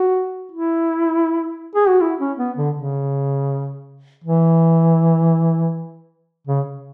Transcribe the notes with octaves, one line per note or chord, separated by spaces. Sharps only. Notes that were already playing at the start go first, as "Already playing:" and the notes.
Already playing: F#4
E4
G#4
F#4
E4
C#4
B3
D3
C#3
E3
C#3